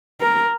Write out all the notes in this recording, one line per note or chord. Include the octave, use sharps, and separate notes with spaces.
A#4